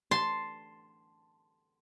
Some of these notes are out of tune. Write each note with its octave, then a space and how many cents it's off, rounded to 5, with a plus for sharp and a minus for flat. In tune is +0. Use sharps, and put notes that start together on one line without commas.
A5 +0 C6 +0